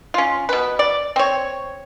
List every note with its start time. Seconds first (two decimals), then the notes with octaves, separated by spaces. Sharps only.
0.14 C#4 F4
0.49 B2 B4
0.79 D5
1.16 C4 C#5